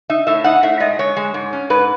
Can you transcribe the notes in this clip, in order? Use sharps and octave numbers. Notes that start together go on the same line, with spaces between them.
D#4 E5
A2 E5
D#4 F#5
A2 E5
G#3 D#5
G#3 C#5
G#3
G#2
C#4
G#2 B4